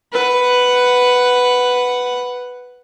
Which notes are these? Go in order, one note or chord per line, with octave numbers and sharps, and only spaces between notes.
B4 F#5